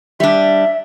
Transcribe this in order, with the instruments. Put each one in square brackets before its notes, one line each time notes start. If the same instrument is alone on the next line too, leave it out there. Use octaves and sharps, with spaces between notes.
[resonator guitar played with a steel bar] G3 D4 [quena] E5